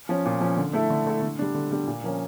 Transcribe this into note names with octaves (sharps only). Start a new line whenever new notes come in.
F3 C#4
A#2
F3 C#4
D3
A3 E4 A4
D3
A3 E4 A4
D3
G3 D4
D3
G3 D4
A#2
F3 A#3 C#4